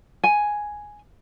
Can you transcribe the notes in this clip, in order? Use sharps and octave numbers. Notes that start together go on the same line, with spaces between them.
G#5